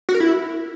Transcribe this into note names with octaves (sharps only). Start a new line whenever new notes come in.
F#4
A#4
E4